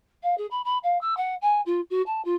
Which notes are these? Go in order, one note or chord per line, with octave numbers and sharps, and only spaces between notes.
F5
G#4
B5
B5
F5
E6
F#5
G#5
F4
F#4
A5
F4